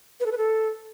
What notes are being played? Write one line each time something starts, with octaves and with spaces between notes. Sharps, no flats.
B4
A4
B4
A4